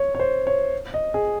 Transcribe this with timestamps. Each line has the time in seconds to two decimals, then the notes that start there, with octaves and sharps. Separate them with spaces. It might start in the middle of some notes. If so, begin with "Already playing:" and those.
Already playing: C#5
0.15 C#5
0.20 C5
0.47 C#5
0.94 D#5
1.14 G#4